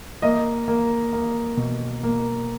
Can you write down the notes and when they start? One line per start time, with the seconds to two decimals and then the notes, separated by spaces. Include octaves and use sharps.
0.22 A#3 D#5
0.68 A#3
1.13 A#3
1.57 B2
2.03 A#3